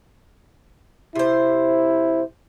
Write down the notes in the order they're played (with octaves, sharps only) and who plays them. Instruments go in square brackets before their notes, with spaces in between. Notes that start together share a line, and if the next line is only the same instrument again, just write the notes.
[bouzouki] C3 C5 [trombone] E4